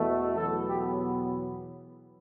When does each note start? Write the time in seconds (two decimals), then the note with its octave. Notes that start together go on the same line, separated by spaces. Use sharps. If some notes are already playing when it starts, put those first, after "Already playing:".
Already playing: E2 B2 A3
0.36 E2 B2 F#3 B3 A4
0.68 G4